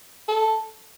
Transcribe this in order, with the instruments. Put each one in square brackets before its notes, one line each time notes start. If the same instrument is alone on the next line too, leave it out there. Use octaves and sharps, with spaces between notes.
[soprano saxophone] A4